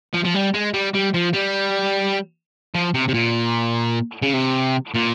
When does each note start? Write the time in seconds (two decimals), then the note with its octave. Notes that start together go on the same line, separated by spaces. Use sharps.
0.14 F3
0.25 F3
0.35 G3
0.54 G#3
0.74 G3
0.95 G3
1.14 F3
1.34 G3
2.75 F3
2.94 C3
3.08 C3
3.14 A#2
4.22 C#3
4.33 C3
4.94 A#2